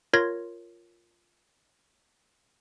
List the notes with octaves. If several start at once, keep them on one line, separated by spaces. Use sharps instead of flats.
F4 A#4 C#5 C6 G#6 A#6